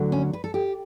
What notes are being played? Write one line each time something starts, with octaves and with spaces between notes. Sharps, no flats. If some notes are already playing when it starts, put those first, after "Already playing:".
Already playing: D2 D3 F#3
C#4
B4
A4
G4